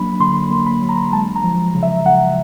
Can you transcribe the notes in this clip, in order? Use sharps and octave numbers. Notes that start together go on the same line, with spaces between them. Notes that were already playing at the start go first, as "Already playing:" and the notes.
Already playing: F#3 A#3 D4 B5
D3 C6
C6
A#3
B5
F#3
A#5
G#3 A5
A#5
F3
C#3
E5
C#3 F#5